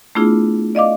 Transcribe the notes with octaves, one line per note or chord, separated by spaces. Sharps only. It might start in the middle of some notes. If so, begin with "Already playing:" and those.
A3 B3 D4 E4 F4 G#4
D5 D#5 F5 D6